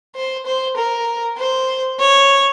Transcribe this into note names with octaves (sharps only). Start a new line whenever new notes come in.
C5
C5
A#4
C5
C#5